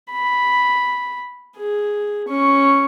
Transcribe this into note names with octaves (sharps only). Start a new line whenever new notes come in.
B5
G#4
C#4 C#6